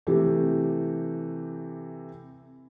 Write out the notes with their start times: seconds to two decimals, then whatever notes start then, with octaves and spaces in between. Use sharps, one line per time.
0.07 C3 E3 A3 G4